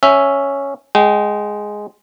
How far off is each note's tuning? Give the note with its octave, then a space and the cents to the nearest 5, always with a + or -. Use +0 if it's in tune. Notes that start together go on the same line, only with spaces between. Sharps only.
C#4 +0 E5 +0
G#3 +0 G5 -25